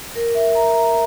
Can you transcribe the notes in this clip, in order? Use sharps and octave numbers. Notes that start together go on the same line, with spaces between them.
A#4
E5
A#5
A#5